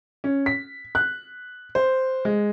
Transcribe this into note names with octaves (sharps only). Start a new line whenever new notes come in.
C#4
B6
F#6
C5
G#3